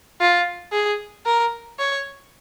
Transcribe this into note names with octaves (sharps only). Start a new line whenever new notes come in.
F4
G#4
A#4
C#5